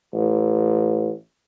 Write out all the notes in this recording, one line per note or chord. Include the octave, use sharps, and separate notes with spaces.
A1